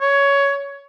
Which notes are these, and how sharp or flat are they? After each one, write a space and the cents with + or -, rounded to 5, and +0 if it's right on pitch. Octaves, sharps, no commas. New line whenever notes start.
C#5 +15